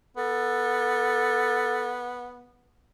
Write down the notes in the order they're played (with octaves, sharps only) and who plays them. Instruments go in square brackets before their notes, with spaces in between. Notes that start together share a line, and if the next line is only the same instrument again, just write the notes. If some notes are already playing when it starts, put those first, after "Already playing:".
[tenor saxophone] B3 [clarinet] A4